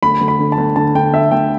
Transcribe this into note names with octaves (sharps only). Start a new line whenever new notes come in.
D2 B5
D2
B5
D3
A5
D2
D3 A5
D3 G5
D2 E5
D2 G5